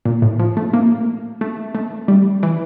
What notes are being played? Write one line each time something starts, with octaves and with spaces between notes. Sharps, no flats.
A#2
A2
F3
A3
A#3
A3
A3
G3
E3